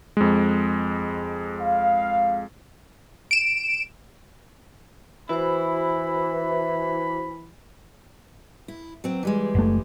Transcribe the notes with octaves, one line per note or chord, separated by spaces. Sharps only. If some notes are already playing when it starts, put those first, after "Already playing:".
F2 G#3
F5
D7 E7
E3 E4 F#4 C5 B5
E4
F#3 C4
E3 G3 G#3
F#1 A3